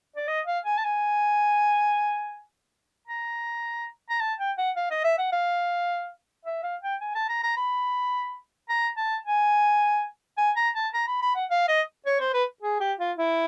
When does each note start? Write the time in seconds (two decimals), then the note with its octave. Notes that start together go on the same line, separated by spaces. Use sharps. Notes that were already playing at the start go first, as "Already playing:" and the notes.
0.16 D5
0.28 D#5
0.46 F5
0.65 G#5
0.78 A5
0.84 G#5
3.08 A#5
4.10 A#5
4.21 A5
4.39 G5
4.58 F#5
4.76 F5
4.91 D#5
5.04 E5
5.19 F#5
5.32 F5
6.45 E5
6.63 F5
6.82 G5
7.01 G#5
7.15 A5
7.29 A#5
7.43 A#5
7.57 B5
8.69 A#5
8.97 A5
9.26 G#5
10.38 G#5
10.57 A#5
10.75 A5
10.94 A#5
11.08 B5
11.22 B5
11.36 F#5
11.50 F5
11.68 D#5
12.06 C#5
12.20 C5
12.34 B4
12.62 G#4
12.80 G4
12.99 F4
13.18 E4